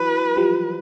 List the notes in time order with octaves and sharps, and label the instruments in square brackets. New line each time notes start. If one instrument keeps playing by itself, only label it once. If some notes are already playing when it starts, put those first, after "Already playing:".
Already playing: [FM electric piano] E3 F#3 [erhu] B4
[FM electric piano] F3 G3